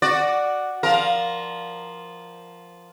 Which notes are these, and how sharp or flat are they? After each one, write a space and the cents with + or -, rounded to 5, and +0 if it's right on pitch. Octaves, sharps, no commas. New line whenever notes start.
F#4 +0 D5 +5
F3 +0 A#4 +10